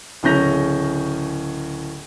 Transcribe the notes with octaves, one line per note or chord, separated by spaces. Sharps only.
D1 C#3 C#4 G6 A#6 F7